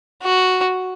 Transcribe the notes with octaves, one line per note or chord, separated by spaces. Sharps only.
F#4